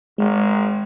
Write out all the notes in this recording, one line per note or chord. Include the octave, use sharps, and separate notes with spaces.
G#1 G#3